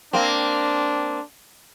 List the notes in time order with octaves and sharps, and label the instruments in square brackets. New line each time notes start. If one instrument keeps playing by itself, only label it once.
[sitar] A#3 C4 [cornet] D4